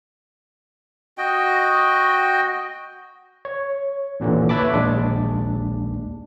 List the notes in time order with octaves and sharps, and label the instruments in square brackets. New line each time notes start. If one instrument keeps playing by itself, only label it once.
[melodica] F#4 D#5 G5
[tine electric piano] C#5
A1 D#2 A#2 D3 E3
B4 C#5 E5 A5 B5 D6
A#1 D#2 G#3 D4